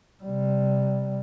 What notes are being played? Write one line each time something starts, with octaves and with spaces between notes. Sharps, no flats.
C3 G3